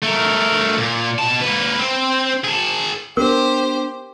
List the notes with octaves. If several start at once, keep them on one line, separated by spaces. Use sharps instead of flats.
A3 A#4
A#2
B2 A5
A#3 B4
C4
G#4 A5
B3 D4 G4 A#4 C5